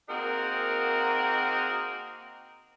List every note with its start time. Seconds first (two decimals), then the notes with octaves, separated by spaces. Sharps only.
0.09 A#3 C4 D#4 F#4 G#4 A#4